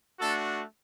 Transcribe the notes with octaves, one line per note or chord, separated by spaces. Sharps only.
A3 D4 F#4 A4